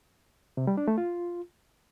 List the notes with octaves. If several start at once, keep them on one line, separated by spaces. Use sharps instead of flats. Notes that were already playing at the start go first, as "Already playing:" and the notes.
C3
G3
D4
A3
F4